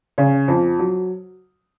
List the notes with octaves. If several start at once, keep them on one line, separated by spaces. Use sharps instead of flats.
C#3
F2
F#3